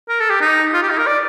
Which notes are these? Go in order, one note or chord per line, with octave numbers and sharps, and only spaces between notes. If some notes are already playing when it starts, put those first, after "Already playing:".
A#4
A4
G4
D#4
F4
G4
D#4
A#4
D5